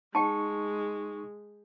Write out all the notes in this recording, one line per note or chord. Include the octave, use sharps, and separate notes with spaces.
G#3 D#4 G5 A5 C#6